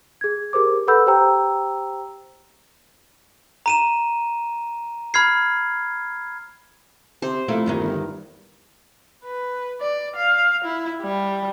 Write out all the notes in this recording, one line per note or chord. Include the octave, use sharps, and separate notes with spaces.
G#4 G#6
G4 G#4 A#4 C5 D6
A4 B4 F#5 B5 E6 G6
G4 C5 G5 A#5 E6
A#5 D#7 E7
B5 F6 G#6 C7
C3 C5
F2 A3 A#3 E4
E2 G2 D#3
G1
B4
D5
F5
E4
G3